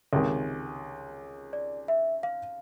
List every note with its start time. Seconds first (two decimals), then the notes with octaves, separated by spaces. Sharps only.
0.13 C#2 C3 D#3
1.53 D5
1.88 E5
2.23 F5